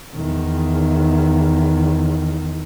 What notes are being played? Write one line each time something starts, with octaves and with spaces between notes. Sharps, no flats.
E2 D#3